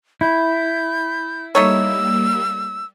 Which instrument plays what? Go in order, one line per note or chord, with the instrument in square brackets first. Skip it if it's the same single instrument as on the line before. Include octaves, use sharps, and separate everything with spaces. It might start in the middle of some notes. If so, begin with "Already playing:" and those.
[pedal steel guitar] E4 [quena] G6
[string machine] G3 A#3 [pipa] A3 D#4 C#5 [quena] E6